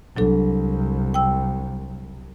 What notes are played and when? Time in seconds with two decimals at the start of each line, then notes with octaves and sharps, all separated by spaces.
0.17 C2 F#3 D4 A4
1.14 G5 E6